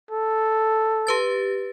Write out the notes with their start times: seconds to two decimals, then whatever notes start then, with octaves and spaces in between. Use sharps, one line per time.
0.11 A4
1.07 G4 B4 A6